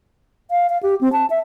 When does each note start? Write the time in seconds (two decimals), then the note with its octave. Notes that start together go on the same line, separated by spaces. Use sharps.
0.51 F5
0.69 F5
0.83 G4
1.01 C4
1.13 A5
1.30 E5